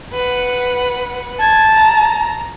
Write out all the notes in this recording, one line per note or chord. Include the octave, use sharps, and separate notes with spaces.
B4 F#5
A5 G#6
A#5